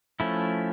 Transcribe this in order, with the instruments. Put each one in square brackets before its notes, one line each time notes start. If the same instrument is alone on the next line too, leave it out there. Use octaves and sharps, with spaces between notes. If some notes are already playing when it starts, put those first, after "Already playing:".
[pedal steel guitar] F3 A3 C#4 E4